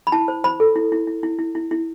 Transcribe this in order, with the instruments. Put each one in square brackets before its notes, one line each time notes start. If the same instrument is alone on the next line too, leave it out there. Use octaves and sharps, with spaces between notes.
[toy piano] B5
E4 A5
C5
C5 B5
A4
E4
E4
E4
E4
E4
E4
E4